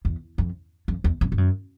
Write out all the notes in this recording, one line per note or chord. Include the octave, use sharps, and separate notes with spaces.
E2
F2
F2
E2
F2
G2
F#2